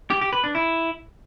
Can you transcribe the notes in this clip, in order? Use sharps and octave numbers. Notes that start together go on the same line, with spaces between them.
G4
G4
B4
D4
E4